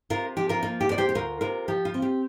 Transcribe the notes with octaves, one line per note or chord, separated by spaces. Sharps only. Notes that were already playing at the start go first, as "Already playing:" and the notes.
C3 F4 A#4
F3 G4
F4 A#4
A#3 F4
G4
C3 D5
G4 C5
G4
D2 F4 A#4
C3 F4 A#4
F3 G4
F4
C4
G4